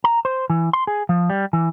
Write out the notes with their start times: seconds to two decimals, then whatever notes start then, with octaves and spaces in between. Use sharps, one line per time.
0.04 A#5
0.25 C5
0.50 E3
0.73 C6
0.87 G#4
1.09 F3
1.30 G3
1.53 E3